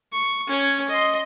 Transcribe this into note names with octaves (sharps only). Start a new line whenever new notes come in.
C#6
C#4 C#5
D#5 C6